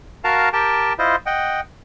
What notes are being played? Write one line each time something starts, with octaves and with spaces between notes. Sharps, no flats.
F#4 A#4 F5 A5 A#5
G4 A#4 G5 A5
E4 F4 C5 D#5
D#5 F#5 G5